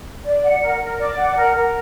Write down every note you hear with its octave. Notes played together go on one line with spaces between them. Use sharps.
D5
F#5
A#4
A#4
D5
F#5
A#4
A#4